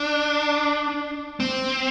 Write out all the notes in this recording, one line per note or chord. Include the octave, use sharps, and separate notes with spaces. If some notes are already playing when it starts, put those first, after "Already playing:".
Already playing: D4
C4